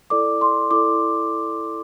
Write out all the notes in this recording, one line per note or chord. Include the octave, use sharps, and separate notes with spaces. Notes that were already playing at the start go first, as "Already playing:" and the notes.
E4 A4 D5 D6
C6
E4 A4 D5 D6